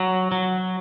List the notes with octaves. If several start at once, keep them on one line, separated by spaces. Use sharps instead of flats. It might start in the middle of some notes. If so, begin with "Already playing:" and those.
Already playing: F#3
F#3